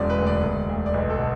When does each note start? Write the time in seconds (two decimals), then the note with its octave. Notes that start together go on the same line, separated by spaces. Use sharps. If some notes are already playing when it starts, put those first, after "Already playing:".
Already playing: E1 F#2 D5
0.10 B4
0.18 D2
0.26 D5
0.43 E1
0.69 D2
0.86 D5
0.94 B1 B4
1.10 A4
1.19 B2